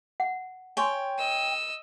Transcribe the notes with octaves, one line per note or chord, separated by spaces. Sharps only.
F#5
C#5 G5 G#5 C6
D#5 E6